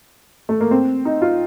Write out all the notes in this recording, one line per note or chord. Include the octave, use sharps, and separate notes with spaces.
A3
A#3
C4
D#4
F4